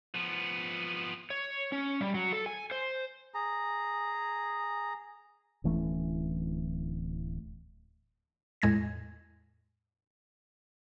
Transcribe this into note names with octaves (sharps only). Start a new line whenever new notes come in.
F3 B3
C#5
C#4
G3
F#3
A4
G#5
C5
G#4 A#5
D1 E3 A3 C#4
E2 A2 G#3 G#6 A#6